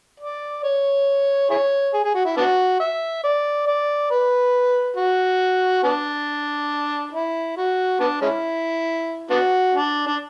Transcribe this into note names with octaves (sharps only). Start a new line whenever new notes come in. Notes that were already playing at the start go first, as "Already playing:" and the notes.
D5
C#5
E4 G#4 C#5
G#4
G#4
F#4
E4
B3 D4 F#4
E5
D5
D5
B4
F#4
B3 D4
E4
F#4
B3 D4
G#3 C#4 E4
B3 D4 F#4
D4
D4